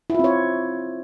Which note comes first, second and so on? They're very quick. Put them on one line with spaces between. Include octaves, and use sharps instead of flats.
E4 F4 C4 C#5